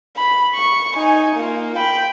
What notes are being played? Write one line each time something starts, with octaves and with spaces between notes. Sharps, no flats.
B5
C#6
D#4 G#5
A#3 F4
G5 B5